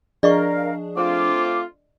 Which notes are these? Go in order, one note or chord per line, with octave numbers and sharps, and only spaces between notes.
F3 D4 G#4 A#4 D5 D#5 F5 C#6
A3 C4 F4 D6